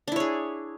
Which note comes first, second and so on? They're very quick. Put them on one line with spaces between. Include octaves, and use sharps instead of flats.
D4 E4 C#5 G#4